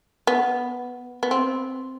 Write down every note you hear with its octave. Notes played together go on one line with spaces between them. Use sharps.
B3
B3
C4